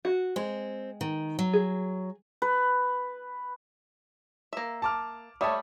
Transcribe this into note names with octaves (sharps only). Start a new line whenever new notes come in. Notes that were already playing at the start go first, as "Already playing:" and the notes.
F#4
G#3 C4
D#3
F#3
G#4
B4
A#3 E5
A5 D6 F6
G3 A3 C#5 E5 D#6